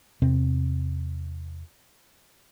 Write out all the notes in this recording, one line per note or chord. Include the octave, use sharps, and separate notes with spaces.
E2 C3 C4